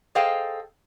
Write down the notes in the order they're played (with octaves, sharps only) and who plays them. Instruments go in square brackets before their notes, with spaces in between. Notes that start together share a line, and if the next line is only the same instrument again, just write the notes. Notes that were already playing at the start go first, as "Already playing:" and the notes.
[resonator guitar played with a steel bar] G#4 A4 C5 D#5 F5 G5